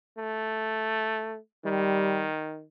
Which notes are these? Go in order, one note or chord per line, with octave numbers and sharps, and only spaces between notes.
A3
D#3 G3